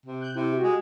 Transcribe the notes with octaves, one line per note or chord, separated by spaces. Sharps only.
C3
F#6 G6
C3 E4
F#4 G4
G#3